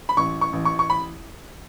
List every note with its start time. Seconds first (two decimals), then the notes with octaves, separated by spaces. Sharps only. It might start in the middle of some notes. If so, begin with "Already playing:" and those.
0.09 B5
0.17 A1 C#6
0.41 C#6
0.53 A1
0.65 C#6
0.79 C#6
0.90 B5